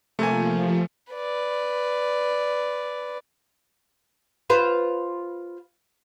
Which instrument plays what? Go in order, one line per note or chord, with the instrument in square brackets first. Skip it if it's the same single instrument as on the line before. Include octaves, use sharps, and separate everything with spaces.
[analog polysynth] C3 A#3 [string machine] F3 [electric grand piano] A3 G#5
[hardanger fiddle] B4 D5
[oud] F4 B4 C5